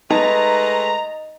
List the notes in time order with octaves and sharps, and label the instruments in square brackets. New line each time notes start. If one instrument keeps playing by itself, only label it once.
[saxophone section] G#3 A3 B4 [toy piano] D#4 [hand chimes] D#5 [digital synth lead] A#5